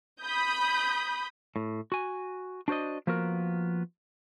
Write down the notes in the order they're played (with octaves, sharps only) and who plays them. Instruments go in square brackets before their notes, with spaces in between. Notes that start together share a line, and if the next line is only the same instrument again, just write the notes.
[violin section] B5 D#6 G6
[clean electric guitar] A2
F#4 G#5
D4 F#4 C5 D5 D#5
F3 A#3 B3 F#4 A#4